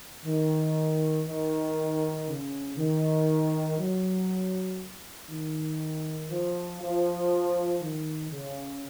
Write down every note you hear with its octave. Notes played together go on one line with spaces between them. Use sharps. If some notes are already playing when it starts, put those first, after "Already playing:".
D#3
D#3
C#3
D#3
F#3
D#3
F3
F3
D#3
C#3